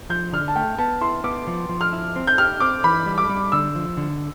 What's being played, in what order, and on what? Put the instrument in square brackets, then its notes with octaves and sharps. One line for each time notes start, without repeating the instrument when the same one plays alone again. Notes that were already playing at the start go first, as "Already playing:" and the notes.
[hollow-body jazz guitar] F3 [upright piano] G6
[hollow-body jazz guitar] D3 [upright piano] F6
[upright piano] A5
[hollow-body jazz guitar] A3 [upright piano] G5
[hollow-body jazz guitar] B3 [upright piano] A5
[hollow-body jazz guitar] E4 [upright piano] C6
[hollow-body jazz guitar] B3 [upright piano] D6
[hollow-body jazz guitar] F3
F3
[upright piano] F6
[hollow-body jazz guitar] E4
C4
[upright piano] G6
[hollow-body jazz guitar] G4 [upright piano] F6
[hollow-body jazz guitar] C4 [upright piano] D6
[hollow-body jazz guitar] E3 [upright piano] B5
[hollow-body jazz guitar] G3
[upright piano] D6
[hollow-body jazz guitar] G3
[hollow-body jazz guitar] D3 [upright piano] E6
[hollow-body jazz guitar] F3
D3